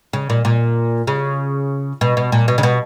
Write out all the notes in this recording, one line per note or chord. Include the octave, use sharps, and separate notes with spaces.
C#3
A#2
A#2
C#3
B2
B2
A#2
B2
C#3
B2